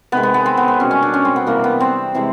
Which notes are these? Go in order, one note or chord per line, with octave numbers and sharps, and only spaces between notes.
C3 D#3 G#3 B3
B3
B3
C4
B3
C4
B2 G3 C#4
C#4
D4
C#4
C4
B3
C3 E3 G3 A#3
B3
C4
C3 E3 G#3